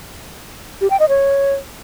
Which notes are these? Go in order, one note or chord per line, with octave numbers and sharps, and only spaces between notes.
G4
G5
D#5
C#5